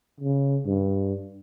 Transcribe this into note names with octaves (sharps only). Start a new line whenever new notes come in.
C#3
G2